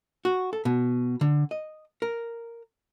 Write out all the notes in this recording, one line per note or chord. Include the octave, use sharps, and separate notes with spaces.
F#4
A4
B2
D3
D#5
A#4